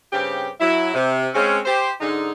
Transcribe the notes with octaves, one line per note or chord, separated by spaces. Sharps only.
G2 C#3 C4 G4
F#3 E4
C3
G#3 C4 C#4
G4 C5
G#2 D3 G#3 D#4